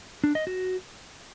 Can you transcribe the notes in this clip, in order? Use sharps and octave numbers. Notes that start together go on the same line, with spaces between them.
D4
D#5
F#4